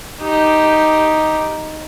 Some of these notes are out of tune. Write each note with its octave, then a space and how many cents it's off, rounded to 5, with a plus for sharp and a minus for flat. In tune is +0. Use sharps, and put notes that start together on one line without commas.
D#4 +0 G4 +0